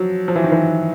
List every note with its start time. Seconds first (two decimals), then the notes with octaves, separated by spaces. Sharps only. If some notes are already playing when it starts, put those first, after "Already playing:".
Already playing: F3 F#3
0.28 F3
0.35 E3
0.44 D#3
0.52 E3